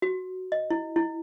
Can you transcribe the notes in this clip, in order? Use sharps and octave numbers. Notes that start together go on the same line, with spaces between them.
F#4
D#5
E4
E4